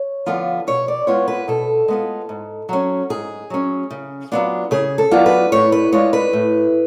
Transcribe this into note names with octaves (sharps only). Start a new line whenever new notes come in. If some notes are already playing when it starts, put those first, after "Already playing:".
Already playing: C#5
D3 F3 B3 F4
B2 C#5
D5
G#3 B3 F4 C#5
B4
B2 A4
G#3 B3 F4
G#2
F#3 C#4
G#2 G#4
F#3 C#4
C#3
F#3 B3 D4 F4
C#3 G#4
A4
F#3 B3 D4 F4
B4
A2 C#5
B4
G#3 D4 F4 C#5
B4
A2